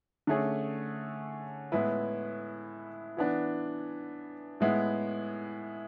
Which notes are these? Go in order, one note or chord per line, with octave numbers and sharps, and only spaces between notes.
D3 A3 C#4 G#4
A2 G#3 B3 E4 B4
E3 B3 D4
A2 G#3 B3 E4